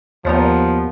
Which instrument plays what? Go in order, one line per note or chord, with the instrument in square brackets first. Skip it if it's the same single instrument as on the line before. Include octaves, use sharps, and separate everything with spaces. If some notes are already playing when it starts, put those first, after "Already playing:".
[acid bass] D#2 [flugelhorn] F3 [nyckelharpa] B3 [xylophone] C#5 D5 A#5